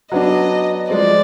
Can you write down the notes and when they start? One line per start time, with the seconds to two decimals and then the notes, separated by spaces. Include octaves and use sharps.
0.12 F#3 B3 D4 D#5
0.89 F3 G#3 C4 D5